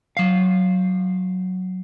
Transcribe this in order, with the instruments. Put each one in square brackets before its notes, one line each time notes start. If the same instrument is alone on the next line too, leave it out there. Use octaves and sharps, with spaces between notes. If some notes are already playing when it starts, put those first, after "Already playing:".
[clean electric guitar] F#3 F5